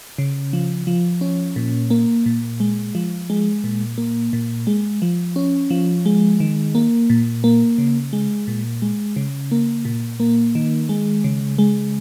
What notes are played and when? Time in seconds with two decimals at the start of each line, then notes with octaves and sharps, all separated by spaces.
0.18 C#3
0.53 F3
0.87 F3
1.21 C#4
1.56 A#2
1.90 A#3
2.26 A#2
2.60 G#3
2.95 F3
3.30 G#3
3.64 A#2
3.98 A#3
4.33 A#2
4.67 G#3
5.02 F3
5.36 C#4
5.70 F3
6.06 G#3
6.40 D#3
6.75 A#3
7.10 A#2
7.44 A#3
7.78 C#3
8.13 G#3
8.48 A#2
8.82 G#3
9.16 C#3
9.51 A#3
9.85 A#2
10.20 A#3
10.55 D#3
10.89 G#3
11.24 C#3
11.58 G#3